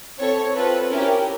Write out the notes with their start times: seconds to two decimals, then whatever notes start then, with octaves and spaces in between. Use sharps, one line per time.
0.20 C4 E4 A4 C#5
0.55 C4 F4 A4 B4
0.90 C#4 E4 G4 A#4